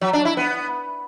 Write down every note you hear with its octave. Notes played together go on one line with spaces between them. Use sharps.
F#3
D4
E4
B3